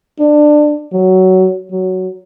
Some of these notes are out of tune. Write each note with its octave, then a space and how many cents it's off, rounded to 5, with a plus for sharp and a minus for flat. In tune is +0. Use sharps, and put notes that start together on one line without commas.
D4 +20
F#3 +15
F#3 +10